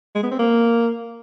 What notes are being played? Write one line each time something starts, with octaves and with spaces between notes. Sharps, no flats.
G#3
B3
C4
A#3